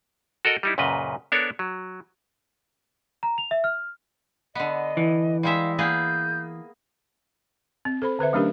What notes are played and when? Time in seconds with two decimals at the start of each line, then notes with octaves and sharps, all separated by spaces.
0.45 F#4 A4 A#4 D#5
0.63 G3 D#4 E4
0.78 F#2 A#2 C#3 B4 D#5
1.32 B3 D4 A4 A#4 C#5
1.59 F#3
3.23 A#5
3.38 F7
3.51 E5
3.64 F6
4.55 D3 B3 D#5
4.97 E3
5.43 G3 G#3 E5 F5
5.79 A#3 B3 G#4 G6
7.85 C4
8.02 A4 C5 B5
8.19 D3 B4 C5 E5
8.33 F#3 A3 C#4 D4 G4 A#4